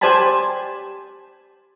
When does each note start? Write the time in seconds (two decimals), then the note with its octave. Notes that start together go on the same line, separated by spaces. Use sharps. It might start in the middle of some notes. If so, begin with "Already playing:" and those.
0.01 G4 C5 D5 G#5 A5 B5